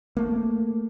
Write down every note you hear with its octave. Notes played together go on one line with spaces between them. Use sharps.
A3 A#3